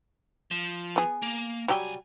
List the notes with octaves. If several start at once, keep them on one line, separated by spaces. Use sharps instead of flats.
F3
B3 G#4
A#3
C2 F#3 G3 G4 G#5